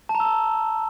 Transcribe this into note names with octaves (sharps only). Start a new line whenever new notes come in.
A5
A#5
E6
A5